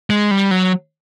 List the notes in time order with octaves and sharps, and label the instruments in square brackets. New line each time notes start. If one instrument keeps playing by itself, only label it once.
[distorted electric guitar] G#3
G3
F#3